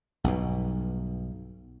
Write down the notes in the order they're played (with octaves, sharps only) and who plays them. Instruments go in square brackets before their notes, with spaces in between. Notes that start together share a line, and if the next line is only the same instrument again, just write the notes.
[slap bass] B1 G2 B2